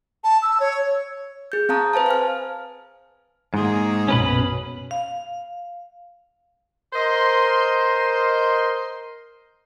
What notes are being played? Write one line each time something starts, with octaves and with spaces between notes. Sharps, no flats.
A5
E6
C#5
G#4 G6
C4 F5 A5 A#5 D#6
B4 C5 F5 A5
F5 G#5 F6
G#2 D#3 A#3 G#4
B1 F#2 B2 C#4 B4 B5
F5
A#4 C5 D#5 C6